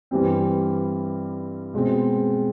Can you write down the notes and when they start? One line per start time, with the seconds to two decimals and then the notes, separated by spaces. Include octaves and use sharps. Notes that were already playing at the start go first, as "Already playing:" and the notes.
0.11 G2 E3 G3 C4
1.74 B2 G#3 C4